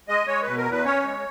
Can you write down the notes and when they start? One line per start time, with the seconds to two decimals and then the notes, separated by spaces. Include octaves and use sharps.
0.08 G#3 D#5
0.27 G#3 C#5
0.43 B2 B4
0.57 A#4
0.66 E2
0.71 B4
0.85 C#4 C#5
1.05 G#3